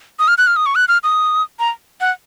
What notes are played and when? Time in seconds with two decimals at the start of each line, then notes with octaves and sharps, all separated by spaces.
0.19 D#6
0.28 F6
0.38 F#6
0.47 F6
0.56 D#6
0.66 C#6
0.75 F#6
0.88 F6
1.03 D#6
1.59 A#5
2.01 F#5